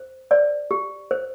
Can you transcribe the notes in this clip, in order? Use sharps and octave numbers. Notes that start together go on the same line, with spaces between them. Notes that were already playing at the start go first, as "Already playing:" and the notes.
Already playing: C5
C5 D5
G4
C5